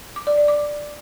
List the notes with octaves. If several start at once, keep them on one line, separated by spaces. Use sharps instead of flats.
D6
D5
D5
D6